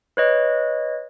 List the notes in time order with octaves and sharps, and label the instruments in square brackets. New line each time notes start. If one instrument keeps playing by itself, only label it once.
[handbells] B4 C#5 D#5